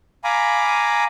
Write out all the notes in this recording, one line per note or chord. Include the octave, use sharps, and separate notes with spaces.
F5 G#5 A#5 B5 D6